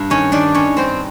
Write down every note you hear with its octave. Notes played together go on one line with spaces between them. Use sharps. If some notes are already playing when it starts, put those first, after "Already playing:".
Already playing: G2
D#3 C#4 C#5
D#3 D4 D5
G2 C#4 C#5
G2 C4 C5